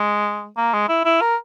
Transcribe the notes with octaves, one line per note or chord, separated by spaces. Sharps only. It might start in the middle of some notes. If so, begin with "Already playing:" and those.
Already playing: G#3
A#3
G#3
E4
E4
A#4